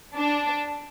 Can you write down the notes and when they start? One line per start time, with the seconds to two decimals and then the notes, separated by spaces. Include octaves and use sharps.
0.16 D4